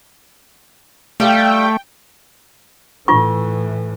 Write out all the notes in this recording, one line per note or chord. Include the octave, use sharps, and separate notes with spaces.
G3 A3 F4 G5
A2 E3 F4 C#6